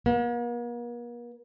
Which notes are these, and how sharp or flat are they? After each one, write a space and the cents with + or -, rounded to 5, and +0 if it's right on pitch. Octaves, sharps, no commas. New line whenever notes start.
A#3 +45